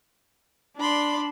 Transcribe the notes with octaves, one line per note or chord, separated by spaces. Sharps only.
D4 D5 B5 C6